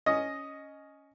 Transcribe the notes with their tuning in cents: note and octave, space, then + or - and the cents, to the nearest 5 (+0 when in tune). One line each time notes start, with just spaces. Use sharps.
C#4 +10 D#5 +0